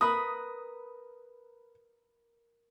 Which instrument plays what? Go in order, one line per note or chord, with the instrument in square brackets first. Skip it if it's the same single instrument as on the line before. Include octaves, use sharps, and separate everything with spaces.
[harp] A#4 B4 B5 [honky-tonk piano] D#6